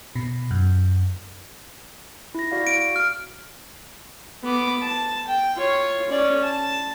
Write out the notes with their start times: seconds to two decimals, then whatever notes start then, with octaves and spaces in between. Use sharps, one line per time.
0.15 B2
0.51 F#2
2.35 E4 A#6
2.52 F#4 D5 F5
2.67 D7
2.96 F6
4.43 B3 D6
4.81 A5
5.27 G5
5.56 F4 C#5
6.10 C#4 D5
6.43 A5